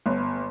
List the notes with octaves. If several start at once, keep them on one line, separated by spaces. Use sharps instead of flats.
G1